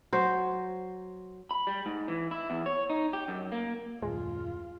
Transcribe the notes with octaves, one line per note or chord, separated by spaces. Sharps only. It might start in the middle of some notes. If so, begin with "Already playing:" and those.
F#3 C5
B5
G3
G#2
E3
E4
E2
C#5
D#4
G4
F#2
A#3
D#1 F#2 G#3 F4